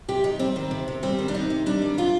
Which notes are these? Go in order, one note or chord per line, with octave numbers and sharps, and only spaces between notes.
C3 G4
C3 D#4
G3 C4
D#3
C3
C3
G3 C4
D#3
D4
C3 D#4
C3
G3 D4
D#3
C3 F4